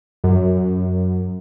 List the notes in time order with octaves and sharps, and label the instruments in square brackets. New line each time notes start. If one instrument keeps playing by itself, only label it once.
[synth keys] F#2